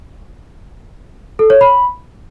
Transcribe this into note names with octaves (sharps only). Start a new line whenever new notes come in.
A4
C#5
B5